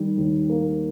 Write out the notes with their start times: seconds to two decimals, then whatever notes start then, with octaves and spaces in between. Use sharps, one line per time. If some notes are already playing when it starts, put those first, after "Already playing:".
Already playing: D#3 G3
0.17 D#2
0.49 A#3